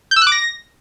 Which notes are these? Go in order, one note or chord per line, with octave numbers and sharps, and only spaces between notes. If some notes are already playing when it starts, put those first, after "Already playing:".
G6
E6
F#6
D6
A#6